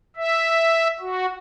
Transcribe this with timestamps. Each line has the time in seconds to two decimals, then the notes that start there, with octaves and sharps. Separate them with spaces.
0.16 E5
1.00 F#4